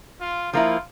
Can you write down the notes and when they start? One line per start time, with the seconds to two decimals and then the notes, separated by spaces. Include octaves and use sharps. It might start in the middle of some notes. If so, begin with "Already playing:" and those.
0.21 F4
0.53 F3 A#3 E4 F4